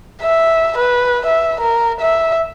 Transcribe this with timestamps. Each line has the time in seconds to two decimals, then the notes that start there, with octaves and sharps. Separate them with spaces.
0.23 E5
0.78 B4
1.26 E5
1.61 A#4
2.01 E5